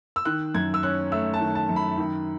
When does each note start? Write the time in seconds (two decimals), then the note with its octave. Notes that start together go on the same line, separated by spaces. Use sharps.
0.16 E6
0.25 D#3 F#6
0.55 F#2 G#6
0.74 E6
0.83 C#4 F#6
1.12 A3 E6
1.34 A5
1.41 D#3
1.55 A5
1.69 F#2
1.76 B5
1.98 D#3